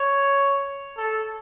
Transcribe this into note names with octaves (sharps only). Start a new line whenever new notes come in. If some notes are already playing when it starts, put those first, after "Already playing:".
Already playing: C#5
A4